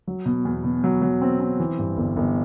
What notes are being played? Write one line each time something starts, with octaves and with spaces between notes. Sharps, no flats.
F#3
B2
E2
B2
F#3
F#3
C4
C4
E3
G2
G1
G1